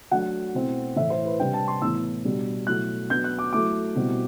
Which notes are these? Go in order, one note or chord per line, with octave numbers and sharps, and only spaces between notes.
F#3 A3 D4 F#5
B2 A3 C4 E4
A2 E3 A3 E5
C5
B4
C3 G3 D4 G5
A5
C6
A2 E3 B3 E4 E6
B2 G3 D4
B2 F#3 A3 E4 F#6
F#3 B3 D4 G6
F#6
D6
F#3 A3 E4 D6
B2 G3 C4 E4